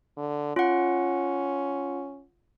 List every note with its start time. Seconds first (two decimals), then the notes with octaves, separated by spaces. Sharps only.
0.17 D3
0.56 C#4 F4 F#5